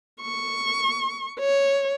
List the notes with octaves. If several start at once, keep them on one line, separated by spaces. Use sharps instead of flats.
C#6
C#5